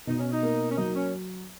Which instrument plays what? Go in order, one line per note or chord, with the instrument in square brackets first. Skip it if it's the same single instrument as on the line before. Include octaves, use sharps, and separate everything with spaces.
[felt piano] B2 [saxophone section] D#4
[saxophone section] C#4
D#4
[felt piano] A#3
[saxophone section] C#4
[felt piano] F#3 [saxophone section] D#4
[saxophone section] C#4